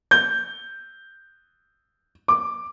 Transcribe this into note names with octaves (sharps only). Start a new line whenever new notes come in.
G6
D6